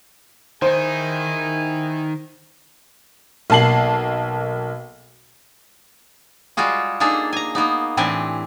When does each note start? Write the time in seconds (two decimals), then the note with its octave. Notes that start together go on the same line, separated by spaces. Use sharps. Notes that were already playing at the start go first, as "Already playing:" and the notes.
0.62 D#3 D#4 E4 G#4 C5 G#5
3.50 B1 A#3 A5 C7 F#7
6.57 G3 G#3 F4 F#4 G#4
7.00 A#3 D4 D#4 G#4 A4
7.33 G#5 A#5
7.55 A#3 B3 D#4
7.97 A2 E3 C4 D4 G4 G#5